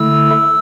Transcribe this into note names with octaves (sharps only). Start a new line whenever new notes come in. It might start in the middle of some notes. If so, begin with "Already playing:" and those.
Already playing: D3 A3 E4 E6